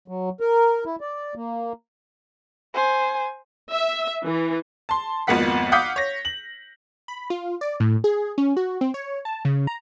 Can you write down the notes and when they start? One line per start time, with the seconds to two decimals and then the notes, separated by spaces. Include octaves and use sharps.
0.08 F#3
0.40 A#4
0.86 E4
1.01 D5
1.36 A#3
2.75 C5 G#5
3.71 E5
4.25 E3
4.89 A5 C6
5.27 G#1 F2 A#3 B3 F#5 B6
5.72 F5 F#5 D6 D#6 G6 B6
5.96 C#5 A#6
6.25 F#7
7.08 B5
7.30 F4
7.61 D5
7.80 A2
8.04 G#4
8.38 C#4
8.57 F#4
8.81 C4
8.94 C#5
9.25 A5
9.45 C#3
9.67 A#5